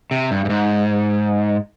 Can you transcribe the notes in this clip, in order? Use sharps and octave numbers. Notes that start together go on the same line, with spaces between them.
C3
G2
G2
G#2